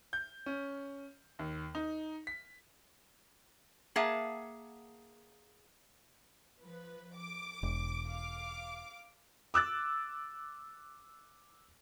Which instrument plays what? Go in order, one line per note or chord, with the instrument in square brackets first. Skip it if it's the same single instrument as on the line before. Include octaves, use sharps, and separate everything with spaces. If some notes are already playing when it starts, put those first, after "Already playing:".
[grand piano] G6
C#4
D#2
D#4
B6
[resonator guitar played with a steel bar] A#3 G#4 E5 F#5 A5
[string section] F3 B4
D6
[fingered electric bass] E1
[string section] F5 D6
[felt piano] D6 E6 F#6 A6